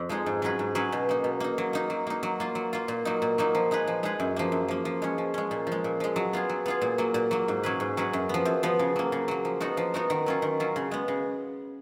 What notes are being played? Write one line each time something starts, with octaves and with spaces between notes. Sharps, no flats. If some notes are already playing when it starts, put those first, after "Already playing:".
Already playing: F2
F3 G#3 D#4 G#4
G#2
F#3 C#4 G#4 B4
G#2
F#3 C#4 G#4 B4
B2
A#3 D#4
B2
A#3 D#4
F#3
A#3 D#4
F#3
A#3 D#4
F#3
A#3 F4
F#3
A#3 F4
A#2
F#3 A#3 D#4
A#2
F#3 A#3 D#4
F3
G#3 D#4 G#4 B4
F3
G#3 D#4 G#4 B4
F#2
F3 A#3
F#2
F3 A#3
F3
G#3 C#4
F3
G#3 C#4
A#2
F3 G#3
A#2
F3 G#3
F#3
B3 F4 G#4
F#3
B3 F4 G#4
A#2
F#3 A#3
A#2
F#3 A#3
G#2
F#3 C#4 G#4 B4
G#2
F#3 C#4 G#4 B4
F#2
F3 B3
F#2
F3 B3
C#3
F#3 A#3
C#3
F#3 A#3
F3
B3 D#4 F#4 A#4
F3
B3 D#4 F#4 A#4
D#3
F#3 C#4 F4
D#3
F#3 C#4 F4
C#3
G#3 B3
C#3